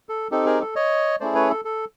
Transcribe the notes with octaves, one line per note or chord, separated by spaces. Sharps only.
A4
C4 D#4 G4 A4
G#4 A#4
A4
C#5 D#5
A3 C#4 E4 G#4 C5 D5
B4 C#5
A4
A4